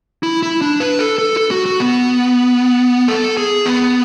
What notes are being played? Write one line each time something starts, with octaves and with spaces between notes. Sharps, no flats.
E4
E4
D4
B4
A4
A4
A4
F#4
F#4
B3
A4
G#4
B3